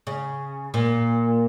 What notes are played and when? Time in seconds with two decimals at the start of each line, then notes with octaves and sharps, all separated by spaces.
0.07 C#3
0.74 A#2